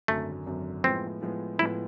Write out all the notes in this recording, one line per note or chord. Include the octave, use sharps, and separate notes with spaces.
G#1 F#2 D3 F#3 A3
G#1 F#2 D3 F#3
A2 F3 G#3 B3 C4
A2 F3 G#3 B3
A2 F3 G#3 B3 E4